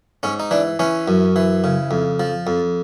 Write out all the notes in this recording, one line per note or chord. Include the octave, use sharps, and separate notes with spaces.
G#2 C#4
D#4
E3 D4
E3 C#4
F#2
E3
C#3
F2
F3
F2